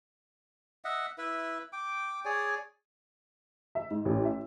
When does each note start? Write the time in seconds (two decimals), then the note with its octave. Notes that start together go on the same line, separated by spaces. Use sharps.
0.85 D#5 E5 F#5
1.18 E4 B4 E5
1.73 G5 D6
2.25 G#4 C#5 D5 G#5
3.75 E5
3.91 G#2
4.05 A1
4.25 E5